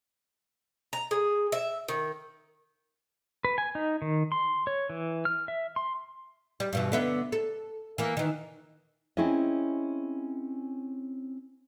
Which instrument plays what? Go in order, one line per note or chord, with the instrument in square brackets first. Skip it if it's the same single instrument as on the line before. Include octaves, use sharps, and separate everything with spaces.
[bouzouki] A#5
G#4
E5
D#3
[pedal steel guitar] B4
G#5
D#4
D#3
C6
C#5
E3
F6
E5
C6
[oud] G3
G2 B2 E3
D3 B3 E5
A4
E3 A#3
D#3 E3
[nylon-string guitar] C4 C#4 E4 G#4 D#5